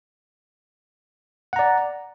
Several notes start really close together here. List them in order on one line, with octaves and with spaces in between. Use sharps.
F#5 A#5 D5